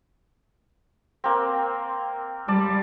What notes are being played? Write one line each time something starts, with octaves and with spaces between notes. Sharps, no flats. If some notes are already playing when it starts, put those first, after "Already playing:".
A#3 C4
G3 D5 A5